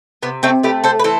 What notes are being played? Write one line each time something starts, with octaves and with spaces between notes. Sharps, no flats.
C3 B3
A3 C4
A3 G4 B4
A4 C5
B4
E3 A4 C5